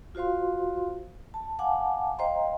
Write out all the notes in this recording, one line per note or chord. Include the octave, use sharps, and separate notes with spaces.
F4 F#4 C5 F5 C6
A5
F5 F#5 G#5 A5 D6
C5 D#5 F5 G5 A#5 C6